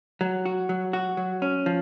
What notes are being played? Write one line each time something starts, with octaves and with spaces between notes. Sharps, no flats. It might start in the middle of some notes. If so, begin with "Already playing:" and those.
F#3
F#4
F#3
F#4
F#3
C#4
F3